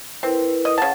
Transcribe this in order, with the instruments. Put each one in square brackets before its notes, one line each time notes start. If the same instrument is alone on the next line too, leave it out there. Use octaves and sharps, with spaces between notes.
[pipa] C4 [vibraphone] E4 A#4 B4
[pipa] D#5
[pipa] C#3 A5 [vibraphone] F#5